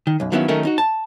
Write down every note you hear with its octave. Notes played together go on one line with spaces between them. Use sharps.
D#3
B1 F#2
D#3 F3 F#3 B3 C#4 E4
D#3 F#3 A3 C#4 D#4 A#4
D#4 F#4
A5